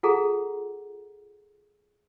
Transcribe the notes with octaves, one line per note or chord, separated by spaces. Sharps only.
F4 G#4 A4 F#5 A#5